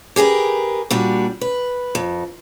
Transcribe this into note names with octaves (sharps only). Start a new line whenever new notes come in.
G4 G#4 A#4 B4
A#2 G3 D4 F#4
B4
F2